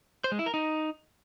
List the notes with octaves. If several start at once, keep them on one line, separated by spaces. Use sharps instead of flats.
C5
G#3
E4
A#4
D#4